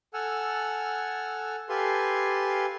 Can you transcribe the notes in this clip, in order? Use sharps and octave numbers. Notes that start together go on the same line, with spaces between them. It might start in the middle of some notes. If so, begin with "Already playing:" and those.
A4 F#5 G#5 E6 F6
G4 A4 B4 F5 G#5 C6